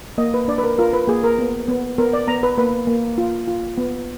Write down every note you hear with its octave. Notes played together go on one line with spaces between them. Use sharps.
A#3 D#5
B4
D4 D5
B4
A#4
F4 A#4
B4
A#3 G#4
A#4
B3
B3
B3 A#4
D5
B3 A#5
B4
A#3 B4
A#3
F4
F4
B3